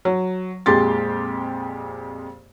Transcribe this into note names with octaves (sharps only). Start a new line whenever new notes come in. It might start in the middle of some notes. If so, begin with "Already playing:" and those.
F#3
F2 A#2 G#3 G4 C6 A6